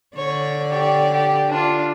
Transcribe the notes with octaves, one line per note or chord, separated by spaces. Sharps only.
D3 C#5 D5
G4 C#5
G4
D4 F4